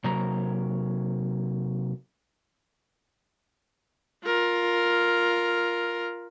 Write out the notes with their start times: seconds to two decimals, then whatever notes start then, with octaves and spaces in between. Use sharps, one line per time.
0.04 C3 F#3 A#3 A#5
4.25 F4 A#4